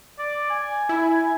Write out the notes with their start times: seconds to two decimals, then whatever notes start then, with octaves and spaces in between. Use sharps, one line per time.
0.19 D5
0.50 G#5
0.89 E4